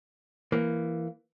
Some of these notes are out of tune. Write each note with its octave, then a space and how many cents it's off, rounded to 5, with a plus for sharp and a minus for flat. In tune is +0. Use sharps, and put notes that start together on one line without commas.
E3 +10 A#3 -5